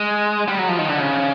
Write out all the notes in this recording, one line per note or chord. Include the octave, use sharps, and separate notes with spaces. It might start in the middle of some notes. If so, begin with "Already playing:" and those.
Already playing: G#3
G3
F#3
F3
D#3
D3
C#3